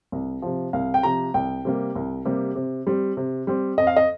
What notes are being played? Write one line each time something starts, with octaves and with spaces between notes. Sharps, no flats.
C2
C3 F3
C2 F5
G5
C3 F3 A#5
C2 G5
C3 G3 A#3
C2
C3 G3 A#3
C3
G3 C4
C3
G3 C4
F2 D#5
F5
D#5